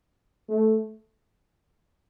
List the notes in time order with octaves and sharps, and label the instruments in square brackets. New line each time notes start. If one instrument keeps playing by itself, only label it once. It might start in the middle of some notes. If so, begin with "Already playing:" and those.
[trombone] A3